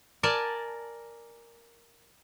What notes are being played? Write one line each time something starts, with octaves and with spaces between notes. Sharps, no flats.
A#4 D5 G#5 A5